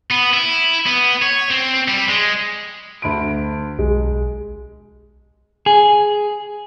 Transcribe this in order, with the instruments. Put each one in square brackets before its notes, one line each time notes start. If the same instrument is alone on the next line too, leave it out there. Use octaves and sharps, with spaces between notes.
[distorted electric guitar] B3
E4
B3
C#5
C4
G3
G#3
[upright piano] D2 B5 D7
[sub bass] B1 [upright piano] G#3
[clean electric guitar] G#4